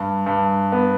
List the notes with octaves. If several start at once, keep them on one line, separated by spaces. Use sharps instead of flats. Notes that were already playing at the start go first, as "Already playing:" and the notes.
Already playing: G2
G2
B3